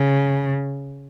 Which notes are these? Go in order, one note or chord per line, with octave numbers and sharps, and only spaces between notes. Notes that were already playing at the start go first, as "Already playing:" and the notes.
Already playing: C#3